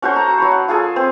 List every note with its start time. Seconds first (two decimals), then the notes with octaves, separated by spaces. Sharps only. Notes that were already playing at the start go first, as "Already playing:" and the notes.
0.02 C#4 F#4 A4 C5
0.15 F#4 A5 A#5
0.38 F#3 B5 C#6
0.52 F#5
0.68 F4 G#4 A4 G#5
0.96 C4 C5